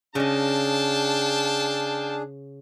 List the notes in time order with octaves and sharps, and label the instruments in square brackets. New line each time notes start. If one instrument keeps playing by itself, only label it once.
[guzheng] C#3 D#5 [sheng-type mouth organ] D4 G#4 [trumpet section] F5 G5 A5